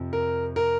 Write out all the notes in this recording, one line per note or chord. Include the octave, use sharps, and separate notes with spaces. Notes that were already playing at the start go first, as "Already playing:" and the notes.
Already playing: F2 C3 F3
A#4
A#4